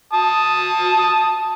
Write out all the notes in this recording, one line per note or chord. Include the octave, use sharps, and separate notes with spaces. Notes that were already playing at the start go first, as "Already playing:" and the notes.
A5 D#6